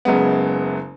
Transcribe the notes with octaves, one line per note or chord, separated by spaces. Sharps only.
F#1 F#2 C#3 G#3 B3